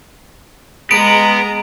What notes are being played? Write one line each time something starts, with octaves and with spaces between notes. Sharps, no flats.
G#3 B3 A#5 D7